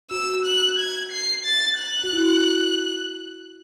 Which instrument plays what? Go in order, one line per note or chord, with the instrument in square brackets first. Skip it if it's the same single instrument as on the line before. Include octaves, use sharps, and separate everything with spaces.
[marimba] F#4 [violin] E6
[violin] F#6
G#6
C7
A6
F#6
[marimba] F#4
E4